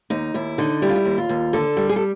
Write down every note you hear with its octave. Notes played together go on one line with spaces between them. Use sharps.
D#2 D#4
D#2 E4
D3 D#4
G3 E4
F4
E4
D#2
F4
D#2
D3 A4
G3
G#4
A4